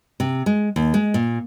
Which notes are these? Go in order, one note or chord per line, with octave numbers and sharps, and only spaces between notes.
C3
G#3
D#2
G#3
A#2